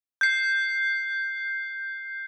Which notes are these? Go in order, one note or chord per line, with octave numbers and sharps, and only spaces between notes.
G6 C7